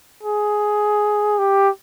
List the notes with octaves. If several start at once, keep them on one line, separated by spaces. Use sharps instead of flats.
G#4
G4